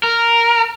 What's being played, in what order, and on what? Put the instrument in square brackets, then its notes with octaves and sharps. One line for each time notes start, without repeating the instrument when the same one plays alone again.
[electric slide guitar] A#4